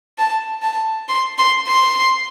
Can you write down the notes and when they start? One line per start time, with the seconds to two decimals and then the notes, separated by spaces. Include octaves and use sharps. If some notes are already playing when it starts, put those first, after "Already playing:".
0.18 A5
0.62 A5
1.08 C6
1.38 C6
1.67 C6